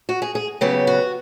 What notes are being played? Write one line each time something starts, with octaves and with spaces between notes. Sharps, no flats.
F#4
G#4
G#4
C#3 F#3 B3 G4
F#4